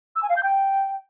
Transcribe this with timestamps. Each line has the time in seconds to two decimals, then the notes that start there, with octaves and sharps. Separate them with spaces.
0.16 E6
0.23 G#5
0.29 F5
0.36 G6
0.43 G5